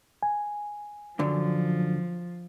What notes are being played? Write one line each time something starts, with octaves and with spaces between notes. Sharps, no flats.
G#5
F#2 D3 F3 F#3